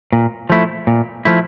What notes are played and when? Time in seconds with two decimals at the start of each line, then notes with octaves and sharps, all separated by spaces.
0.12 A#2
0.50 F3 A3 E4
0.87 A#2
1.25 F3 A3 E4